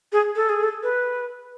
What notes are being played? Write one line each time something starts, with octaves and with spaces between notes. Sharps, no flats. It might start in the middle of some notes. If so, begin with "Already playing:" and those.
G#4
A4
G#4
A4
B4